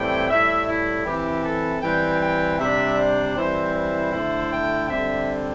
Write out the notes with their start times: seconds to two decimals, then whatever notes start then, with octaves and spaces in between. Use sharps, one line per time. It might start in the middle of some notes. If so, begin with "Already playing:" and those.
Already playing: A2 E3 G3 C4 E4 G5
0.29 A2 G3 E4 E5
0.67 E4
1.06 E3 C4 E4 G4
1.44 A4
1.82 E3 G3 C4 G5
2.21 G5
2.59 C3 G3 D4 E5
2.97 C5
3.36 E3 G3 C4 E4 C5
3.74 C5
4.13 D3 A3 E4
4.52 G5
4.90 D3 G3 C4 E5